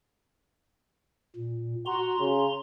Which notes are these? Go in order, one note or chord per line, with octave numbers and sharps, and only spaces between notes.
A#2
F#4 A#5 C6
C#3